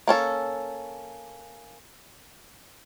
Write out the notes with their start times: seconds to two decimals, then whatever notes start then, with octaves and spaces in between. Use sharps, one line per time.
0.08 A#3 C#4 A4